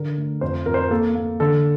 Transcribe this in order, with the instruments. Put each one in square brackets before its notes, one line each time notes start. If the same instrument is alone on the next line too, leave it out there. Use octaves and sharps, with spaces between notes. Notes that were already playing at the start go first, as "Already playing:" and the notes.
Already playing: [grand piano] D3 A#4
A3
F2 C5
F2 A#4
C5
A#4
A#3 A4
A#3
D3 A4